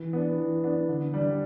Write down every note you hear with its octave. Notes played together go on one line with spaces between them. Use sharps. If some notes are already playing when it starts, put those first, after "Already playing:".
Already playing: E3
B3 D4
E3
B3 D4
D3
G3 D4